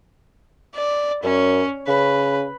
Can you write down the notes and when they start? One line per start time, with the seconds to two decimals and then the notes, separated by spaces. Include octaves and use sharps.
0.75 D5
1.24 F#2 C#4
1.88 C#3 B4